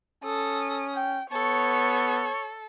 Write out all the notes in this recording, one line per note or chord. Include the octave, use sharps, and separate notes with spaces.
C#4 A4 D#6
G5
B3 A4 C#5 C#6